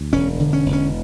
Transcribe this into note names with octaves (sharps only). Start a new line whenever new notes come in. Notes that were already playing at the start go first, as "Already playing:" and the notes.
Already playing: D2
E1 C#4
D3
C#4
E1
C#4